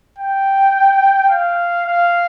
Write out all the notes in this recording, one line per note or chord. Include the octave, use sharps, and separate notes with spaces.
G5
F5
F5